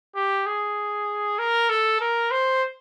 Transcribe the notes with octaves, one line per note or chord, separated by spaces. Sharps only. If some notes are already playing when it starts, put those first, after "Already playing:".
G4
G#4
A#4
A4
A#4
C5